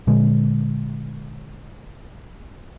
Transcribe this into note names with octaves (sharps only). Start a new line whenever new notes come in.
A#2 D3 G#3